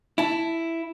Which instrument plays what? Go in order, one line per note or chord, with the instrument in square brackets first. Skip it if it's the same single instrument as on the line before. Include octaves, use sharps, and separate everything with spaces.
[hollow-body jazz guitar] E4 A5